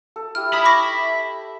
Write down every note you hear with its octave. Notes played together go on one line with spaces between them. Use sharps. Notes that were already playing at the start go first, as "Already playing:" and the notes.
A4
E4 G4 F6
E5 B5 D#6
C#6 D6 A#6